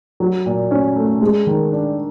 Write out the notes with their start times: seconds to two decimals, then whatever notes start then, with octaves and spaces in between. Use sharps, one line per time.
0.20 F#3
0.46 A#2
0.71 C#4
0.96 A3
1.21 G#3
1.47 D#3
1.72 D4